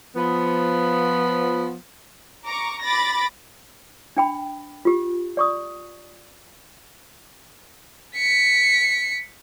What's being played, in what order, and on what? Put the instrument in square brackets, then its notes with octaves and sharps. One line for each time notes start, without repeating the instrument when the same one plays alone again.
[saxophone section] F3 B3
[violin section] A#5 C#6 D6
B5 D6 A6 A#6
[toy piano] D4 G5 B5
F4 G4
D5 C#6 D#6
[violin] B6 C#7